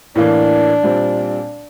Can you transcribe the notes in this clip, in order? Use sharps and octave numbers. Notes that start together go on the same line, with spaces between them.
A2 E3 A#3 D4
A#2 G3 C4